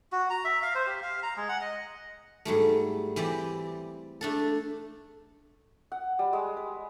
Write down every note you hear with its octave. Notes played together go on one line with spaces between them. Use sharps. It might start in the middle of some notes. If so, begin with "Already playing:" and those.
F#4
A#5
E5
F5
C5
G4
F5
A#5
G#3
F#5
D#5
G#2 F#3 G3 A3
E3 C4 G4 D5
A3 D4 A4
F#5
G3
G#3
B4